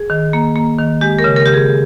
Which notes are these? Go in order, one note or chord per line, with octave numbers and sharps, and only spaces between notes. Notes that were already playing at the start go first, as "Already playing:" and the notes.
Already playing: G#4
D#3
A#3
A#3
D#3
G#3 G4
A#4
C#3
A#4
C#3 G4
G#4